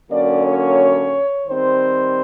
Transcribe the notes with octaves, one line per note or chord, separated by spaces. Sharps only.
D3 F#3 A#3 C#4 D5
C#5
D#3 G3 C4 C5